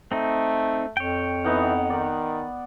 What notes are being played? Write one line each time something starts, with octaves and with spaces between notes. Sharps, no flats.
A3 C4 D#4
F2 C#5 G5
E3 B3 D#4 F#5
D#3 D5